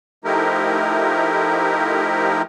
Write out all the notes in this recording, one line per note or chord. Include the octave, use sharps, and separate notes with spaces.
F3 A3 D#4 E4 G4 A#4